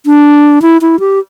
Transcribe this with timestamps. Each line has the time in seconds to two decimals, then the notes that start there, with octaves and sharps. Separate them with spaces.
0.06 D4
0.62 E4
0.81 E4
1.00 G4